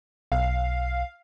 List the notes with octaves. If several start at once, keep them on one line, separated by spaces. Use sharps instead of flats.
B1 F5